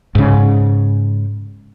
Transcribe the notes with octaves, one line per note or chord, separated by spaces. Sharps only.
G#2 C#3